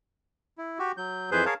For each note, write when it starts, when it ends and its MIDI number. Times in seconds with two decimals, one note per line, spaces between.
0.58 0.79 64
0.79 0.92 66
0.79 0.92 67
0.97 1.30 54
0.97 1.30 91
1.31 1.45 41
1.31 1.45 52
1.31 1.45 68
1.31 1.45 71
1.31 1.45 72
1.31 1.45 91
1.45 1.54 68
1.45 1.54 70
1.45 1.54 73
1.45 1.54 77
1.45 1.54 81